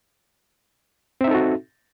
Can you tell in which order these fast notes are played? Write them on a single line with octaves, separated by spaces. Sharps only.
C4 E5 D#4 A4 F#4